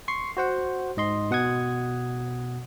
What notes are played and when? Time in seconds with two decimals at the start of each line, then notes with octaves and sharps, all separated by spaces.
0.08 C6 C#6 C7
0.37 F#4 C5 F#5
0.97 G#2 D#5 C6
1.31 B2 F#5 D#6 G#6